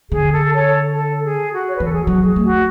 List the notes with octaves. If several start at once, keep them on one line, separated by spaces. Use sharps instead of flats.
D3 G#4
A4
A4 C#5
A4
G#4
F#4
C#5
B4
E3 A4
G#4
F#4
F#3
G#4
A3
F#4